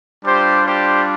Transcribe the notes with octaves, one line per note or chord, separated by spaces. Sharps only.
G3 D4 F4 G4 C5
G4 C5